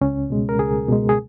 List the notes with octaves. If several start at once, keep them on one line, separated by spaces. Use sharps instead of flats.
C#2 C#4
B2 G#3
A#4
C#2 G#4
B2 G#3
G#4